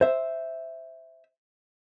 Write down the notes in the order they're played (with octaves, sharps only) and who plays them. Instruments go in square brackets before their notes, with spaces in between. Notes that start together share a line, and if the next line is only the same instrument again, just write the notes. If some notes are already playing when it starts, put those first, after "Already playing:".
[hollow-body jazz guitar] C5 E5